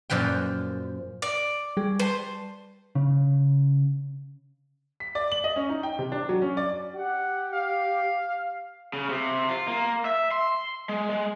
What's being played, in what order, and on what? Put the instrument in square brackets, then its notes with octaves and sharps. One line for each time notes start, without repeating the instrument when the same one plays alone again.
[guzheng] F#2 A#2 F3 B4 G5
[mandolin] D5
[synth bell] G3 G#4
[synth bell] B4 A5 [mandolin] C5
[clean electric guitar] C#3
[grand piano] B6
D5
F#7
D#5
C#4
D#4
G5
C3
D4
F#3
C#4
D5
[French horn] G4 [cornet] F#5
[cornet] F5
[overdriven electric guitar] C#3
C3
F4
A#3
E5
C6
G#3
G#3